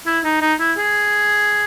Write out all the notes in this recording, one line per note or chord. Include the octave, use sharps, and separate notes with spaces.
E4
D#4
D#4
E4
G#4